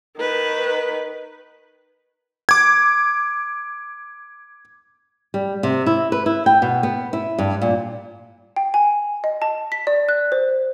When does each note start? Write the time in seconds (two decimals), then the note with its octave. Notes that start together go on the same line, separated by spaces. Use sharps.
0.18 D#3 B4
2.49 D6 G#6
5.34 G3
5.63 C3
5.86 E4
6.12 B4
6.26 E4
6.46 G5
6.62 B2
6.83 B3
7.13 E4
7.38 G2
7.62 A#2
8.56 G5
8.74 G#5
9.24 D#5
9.42 A5
9.72 B6
9.87 D5
10.09 F#6
10.32 C5